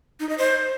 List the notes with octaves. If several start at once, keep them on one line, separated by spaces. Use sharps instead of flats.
D#4
D#5
C5